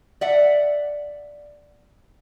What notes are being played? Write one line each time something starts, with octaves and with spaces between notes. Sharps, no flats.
D5 E5 F#5